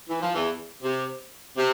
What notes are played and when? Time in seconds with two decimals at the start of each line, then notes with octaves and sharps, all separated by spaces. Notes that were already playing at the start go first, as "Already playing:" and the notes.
0.09 E3
0.22 F3
0.35 E2 E3
0.82 C3
1.57 C3